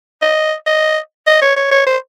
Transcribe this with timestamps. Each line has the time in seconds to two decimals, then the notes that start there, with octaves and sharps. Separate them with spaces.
0.22 D#5
0.66 D#5
1.27 D#5
1.42 C#5
1.56 C#5
1.71 C#5
1.86 C5